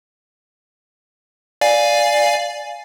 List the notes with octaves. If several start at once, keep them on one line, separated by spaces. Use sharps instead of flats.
D5 F5 G#5